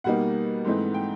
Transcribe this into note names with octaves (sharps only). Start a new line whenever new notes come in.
B2 G3 A#3 D#4 F#5
G#2 E3 A3 C4 D#4
G5